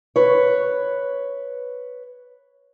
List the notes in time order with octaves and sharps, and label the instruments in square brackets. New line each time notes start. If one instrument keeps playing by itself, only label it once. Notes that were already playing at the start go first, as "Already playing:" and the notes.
[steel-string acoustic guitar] B4 C#5